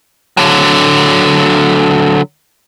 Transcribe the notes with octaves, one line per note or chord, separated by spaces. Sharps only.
D3 F#3